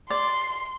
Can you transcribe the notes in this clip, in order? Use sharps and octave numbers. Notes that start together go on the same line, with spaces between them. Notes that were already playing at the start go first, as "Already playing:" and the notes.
D5 C6